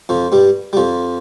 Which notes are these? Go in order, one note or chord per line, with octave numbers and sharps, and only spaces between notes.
F2 F3
G2 G3
G3
F2 F3